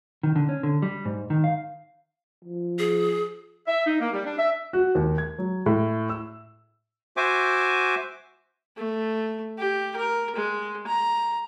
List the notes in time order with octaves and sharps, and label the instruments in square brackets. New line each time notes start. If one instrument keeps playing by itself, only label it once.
[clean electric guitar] D#3
D3
C#4
D3
G3
G#2
D#3
F5
[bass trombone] F3
[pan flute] G#4
[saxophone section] E5
D#4
A#3
G3
D4
E5
[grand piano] F#4
D#2
G#6
F#3
A2
E6
[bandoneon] F#4 C5 E5 G#5 D6
[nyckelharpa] A3
G4
A#4
G#3
A#5